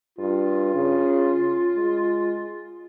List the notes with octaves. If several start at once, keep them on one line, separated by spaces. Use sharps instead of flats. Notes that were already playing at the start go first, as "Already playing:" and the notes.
G2 F4
C#3
G#3